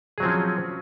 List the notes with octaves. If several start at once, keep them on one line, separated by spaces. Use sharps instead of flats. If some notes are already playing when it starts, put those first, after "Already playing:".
F3 F#3 C4 C#4 G#4